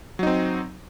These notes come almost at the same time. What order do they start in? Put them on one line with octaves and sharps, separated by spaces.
F#3 D#4 C4